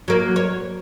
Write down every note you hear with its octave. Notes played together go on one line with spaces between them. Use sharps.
F#3 A#3
C#5